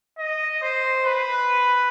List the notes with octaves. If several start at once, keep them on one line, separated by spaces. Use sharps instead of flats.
D#5
C5
B4